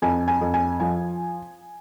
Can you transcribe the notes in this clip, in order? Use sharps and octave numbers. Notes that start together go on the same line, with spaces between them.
F2 G#5
G#5
F2
G#5
F3 G#5